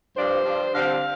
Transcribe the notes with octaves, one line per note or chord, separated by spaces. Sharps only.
G2 F3 D4 C5
G2 F3 D4
D3 G3 C4 F5